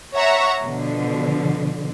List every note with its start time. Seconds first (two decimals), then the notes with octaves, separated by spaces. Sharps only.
0.16 C#5 E5 F#5 A#5 C#6
0.62 B2 D3 F3